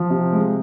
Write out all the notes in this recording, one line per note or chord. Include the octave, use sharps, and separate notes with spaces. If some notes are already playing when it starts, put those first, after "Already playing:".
Already playing: F3
C3
G#3